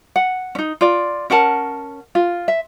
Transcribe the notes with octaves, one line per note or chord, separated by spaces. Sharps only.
F#5
C#4 D#4
F4 D5
C#4 A#4 F#5 A5
F4
E5